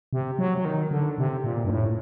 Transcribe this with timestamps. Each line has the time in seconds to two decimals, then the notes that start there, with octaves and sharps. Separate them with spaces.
0.13 C3
0.39 F#3
0.58 F#3
0.65 D#3
0.91 D3
1.18 C3
1.44 A#2
1.65 G2
1.70 A2